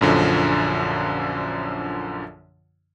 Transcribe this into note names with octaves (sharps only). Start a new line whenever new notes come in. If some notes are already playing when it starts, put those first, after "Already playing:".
A#1 F#2 D3 F3